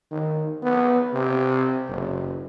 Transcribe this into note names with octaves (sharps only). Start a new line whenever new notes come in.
D#3
B3
C3
F#1